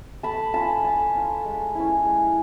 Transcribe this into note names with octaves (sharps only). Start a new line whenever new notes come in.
A3 A5 B5
C#4 F4 A5 B5
A3 A5 B5
C#4 F4
G#3
C#4 E4
G#3